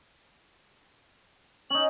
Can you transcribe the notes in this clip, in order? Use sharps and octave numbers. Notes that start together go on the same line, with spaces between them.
C#4 D#4 F#7